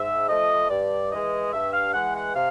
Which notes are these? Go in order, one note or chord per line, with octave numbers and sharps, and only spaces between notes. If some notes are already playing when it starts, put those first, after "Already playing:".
Already playing: G#2 E5
F3 A3 D#5
G2 D5
E3 G#3 D#5
G2 E5
F5
E3 G#3 F#5
F#5
C3 F5